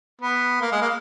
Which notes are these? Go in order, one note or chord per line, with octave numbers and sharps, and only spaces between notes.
B3
A#3
G#3
A#3